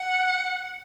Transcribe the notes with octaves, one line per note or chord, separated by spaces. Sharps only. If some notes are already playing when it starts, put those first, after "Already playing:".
Already playing: F#5